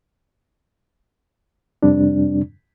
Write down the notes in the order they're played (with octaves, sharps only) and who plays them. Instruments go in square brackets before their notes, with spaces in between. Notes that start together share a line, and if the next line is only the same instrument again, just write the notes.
[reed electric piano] F2 C3 G3 C4 D4